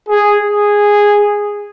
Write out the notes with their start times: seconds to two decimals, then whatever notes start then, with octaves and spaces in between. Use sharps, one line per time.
0.09 G#4
0.40 G#4